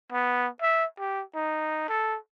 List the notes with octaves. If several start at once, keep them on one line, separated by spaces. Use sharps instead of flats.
B3
E5
G4
D#4
A4